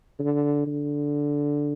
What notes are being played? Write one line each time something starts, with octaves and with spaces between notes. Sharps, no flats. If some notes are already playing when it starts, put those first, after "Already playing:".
D3
D3